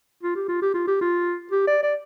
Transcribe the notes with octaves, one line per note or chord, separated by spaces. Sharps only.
F4
G4
F4
G4
F4
G4
F4
G4
D5
D5